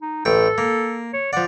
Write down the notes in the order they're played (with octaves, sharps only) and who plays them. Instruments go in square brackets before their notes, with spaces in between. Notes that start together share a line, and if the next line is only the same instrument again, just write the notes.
[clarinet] D#4
[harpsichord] A1 G5 [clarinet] A4
[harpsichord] A#3
[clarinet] C#5
[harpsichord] F3 D5 [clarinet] F#5